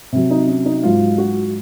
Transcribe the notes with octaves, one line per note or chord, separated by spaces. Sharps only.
C3 F#3
D#4
C#4
D#4
G#2 F#3 F4
F#4